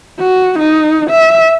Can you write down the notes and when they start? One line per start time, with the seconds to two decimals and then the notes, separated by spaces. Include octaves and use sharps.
0.19 F#4
0.59 D#4
1.11 E5